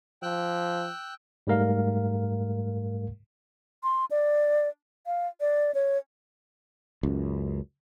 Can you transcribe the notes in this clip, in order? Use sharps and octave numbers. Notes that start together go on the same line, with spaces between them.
F3 G5 E6 F#6
G#2 G3 A3 A#4 F5
C6
D5
F5
D5
C#5
C#2 F#2